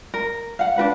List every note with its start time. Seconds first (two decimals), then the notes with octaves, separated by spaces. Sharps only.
0.14 A#4
0.59 F5 F#5
0.76 D4 F#4 B4 F#5